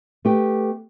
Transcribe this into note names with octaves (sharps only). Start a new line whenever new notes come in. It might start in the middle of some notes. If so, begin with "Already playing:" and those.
A3 B3 G4